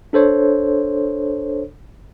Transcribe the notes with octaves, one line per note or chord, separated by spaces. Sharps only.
D4 A4 C5 C#5